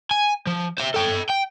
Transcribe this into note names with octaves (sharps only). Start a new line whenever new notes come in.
G#5
F3
C5 E5
A4 G5
G5